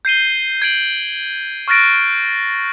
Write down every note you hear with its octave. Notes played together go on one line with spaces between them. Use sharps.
G6 C7 D#7 G7
G#6 D7 F#7
C#6 F6 F#6 A6 A#6 D7